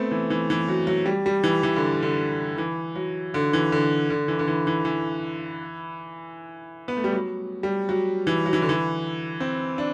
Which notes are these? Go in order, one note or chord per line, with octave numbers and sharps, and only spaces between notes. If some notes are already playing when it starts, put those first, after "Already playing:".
Already playing: A3 B3 C4
E3
E3
E3
F#3
F#3
G3
G3
E3
E3
D3
D3
E3
F#3
D3
E3
D3
D3
E3
D3
E3
E3
E3
B3
A3
G3
F#3
G3
F#3
E3
F#3
E3
D3
E3
C4
D4